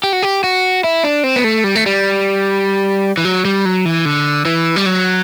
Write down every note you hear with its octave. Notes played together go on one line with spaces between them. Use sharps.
G4
F#4
G4
F#4
E4
D4
C4
B3
A3
G3
A3
G3
E3
F#3
G3
F#3
E3
D3
E3
G3
F#3